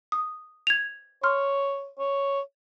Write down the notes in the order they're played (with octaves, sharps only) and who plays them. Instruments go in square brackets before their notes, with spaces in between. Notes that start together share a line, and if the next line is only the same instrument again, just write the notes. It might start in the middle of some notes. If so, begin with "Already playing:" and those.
[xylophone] D#6
G#6 F7
[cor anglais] C#5 [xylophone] C6 F6
[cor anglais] C#5